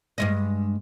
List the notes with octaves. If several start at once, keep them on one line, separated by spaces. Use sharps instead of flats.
G2 G#3 D#5